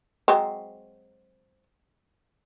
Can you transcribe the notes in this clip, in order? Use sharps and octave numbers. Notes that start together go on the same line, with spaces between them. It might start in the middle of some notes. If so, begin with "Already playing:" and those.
F#3 G#3 C4